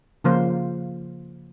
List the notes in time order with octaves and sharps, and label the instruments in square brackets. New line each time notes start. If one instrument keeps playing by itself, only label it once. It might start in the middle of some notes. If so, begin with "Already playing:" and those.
[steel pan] C#3 F3 A#3 F4 C5